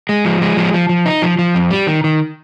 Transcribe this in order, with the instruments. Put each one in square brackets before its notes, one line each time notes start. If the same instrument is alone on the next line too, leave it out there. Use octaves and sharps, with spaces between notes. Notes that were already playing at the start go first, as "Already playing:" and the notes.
[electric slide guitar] G#3
F3
G#3
F3
F3
F3
D#4
F3
F3
F2
G3
D#3
D#3